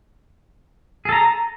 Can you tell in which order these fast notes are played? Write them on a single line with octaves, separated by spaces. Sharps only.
G#4 A4 A#5